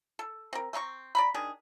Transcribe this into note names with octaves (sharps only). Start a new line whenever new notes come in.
A4
C4 A#4
A3 C4 A#5 C#6
D5 A#5 B5
D#3 D4 G#4